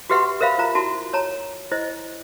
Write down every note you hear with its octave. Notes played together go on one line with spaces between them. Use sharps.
F#4 G4 B4 E5 F#5 C6
A#4 C5 E5 F5 B5
F4 C5 A#5
E4 F#4 A5
C#5 A5 A#5
E4 C5 D#5